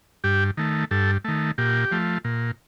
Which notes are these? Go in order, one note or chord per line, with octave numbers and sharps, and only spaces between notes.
G2 G4
D#3 A3
G2 A4
D#3 A3
A#2 G4
F3 A3
A#2